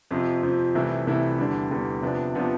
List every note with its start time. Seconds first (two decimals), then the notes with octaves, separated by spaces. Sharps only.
0.11 F2 C3 F3
0.43 F2 C3 F3
0.75 C2 C3 E3 A3 E4
1.07 C2 C3 E3 A3 E4
1.39 E2 D3 G3 D4
1.71 E2 D3 G3 D4
2.02 C3 F3 B3 D4
2.34 C3 F3 B3 D4